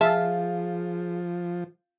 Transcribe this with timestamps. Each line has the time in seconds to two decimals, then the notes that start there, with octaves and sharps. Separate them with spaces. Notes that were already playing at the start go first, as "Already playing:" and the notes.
0.01 F3 F4 G#4 E5 A5